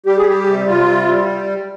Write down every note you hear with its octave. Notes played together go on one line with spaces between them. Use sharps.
G3 G4
G#4
G3 G4
C3
C3 F4
G3
G3